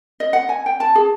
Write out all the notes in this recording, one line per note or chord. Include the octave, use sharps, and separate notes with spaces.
D#5
F#5
G#5
G5
A5
G#4